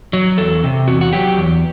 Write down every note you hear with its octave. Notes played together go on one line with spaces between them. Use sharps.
F#3
E2 A4
C3
E2 F#4
F#4
F#3 G4
E2